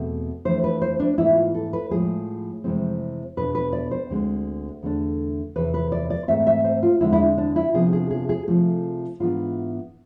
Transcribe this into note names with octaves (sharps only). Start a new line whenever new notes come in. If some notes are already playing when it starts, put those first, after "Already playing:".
Already playing: E2 B2 A3 C4
F2 E3 A3 D4 C5
B4
C5
D4
G#2 E3 B3 E4
F4
A4
B4
A2 F3 G#3 G#4
F2 C3 E3 G#3 C4
E2 B2 B3 D4 B4
B4
D5
C5
D2 D3 G#3 C4
E2 D3 A3 D4
E2 C3 E3 B4
B4
D5
D5
G#2 E3 A3 C4 E5
E5
C5
F4
E2 D3 G#3 C4 E4
E4
D4
D4
E4
C3 F3 B3 D4 G#4
G#4
G#4
G#4
C3 F3 A3 G#4
G#2 E3 B3 D4 F4